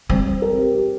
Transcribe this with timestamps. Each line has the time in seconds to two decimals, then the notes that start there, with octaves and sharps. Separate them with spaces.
0.10 G3 C4
0.26 C4
0.42 A#4
0.58 G4
0.75 G4